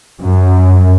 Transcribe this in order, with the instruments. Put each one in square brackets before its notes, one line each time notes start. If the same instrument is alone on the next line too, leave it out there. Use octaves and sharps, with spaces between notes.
[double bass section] F#2